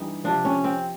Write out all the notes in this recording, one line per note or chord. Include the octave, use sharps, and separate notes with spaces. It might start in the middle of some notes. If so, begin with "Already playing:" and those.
Already playing: G2 E3 G3 D#4
C3 F3 D4
C#4
C4